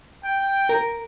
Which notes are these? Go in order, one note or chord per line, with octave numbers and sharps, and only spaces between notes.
G5
A#4